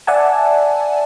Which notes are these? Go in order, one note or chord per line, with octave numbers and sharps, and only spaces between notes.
D5 E5 F#5 G#5 A5